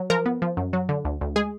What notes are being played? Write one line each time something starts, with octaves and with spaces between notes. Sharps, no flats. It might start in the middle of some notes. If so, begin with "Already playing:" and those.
Already playing: F#3
F3 A#4
B3
F3
F#2
F#3
D3
D2
D2
G#3 G#4